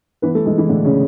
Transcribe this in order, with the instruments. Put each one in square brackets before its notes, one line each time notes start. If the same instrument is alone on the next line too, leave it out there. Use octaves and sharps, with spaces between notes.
[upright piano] E3 B3 B4
A3 A4
E3 G#3 G#4
E3 E4
A2 D3 D4
C#3 C#4